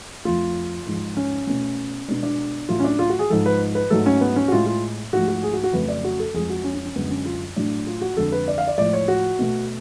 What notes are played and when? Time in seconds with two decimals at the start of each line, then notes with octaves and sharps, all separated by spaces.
0.25 F2 F3 A3 F4
0.86 G#2 F3 G#3
1.17 C#4
1.47 B2 A3 C#4
2.08 B2 G#3 D4
2.23 D4
2.69 A2 F#3 A3 F4
2.80 C#4
2.84 D4
2.99 F4
3.09 F#4
3.19 G#4
3.30 G#2 F3 G#3 A4
3.46 B4
3.75 B4
3.90 G#2 F#3 A3 A4
4.06 C#4
4.21 B3
4.36 C#4
4.48 F#4
4.52 A2 G#3 F4
4.67 F4
5.13 G#2 F3 A3 F#4
5.28 F#4
5.43 G#4
5.53 F#4
5.64 F#4
5.73 F2 C#3 F#3 A3 B4
5.88 D5
6.04 F#4
6.19 A4
6.34 F2 F3 G#3 G#4
6.50 F#4
6.64 C#4
6.75 C#4
6.85 C#4
6.96 F#2 D3 G#3 B3
7.10 C#4
7.26 F4
7.56 A2 F#3 A3 D4
7.87 F4
8.01 F#4
8.17 F2 D3 G#3 A4
8.32 B4
8.48 D5
8.58 F5
8.67 D5
8.78 A2 F3 G#3 D5
8.93 C#5
9.08 F#4
9.39 B2 A3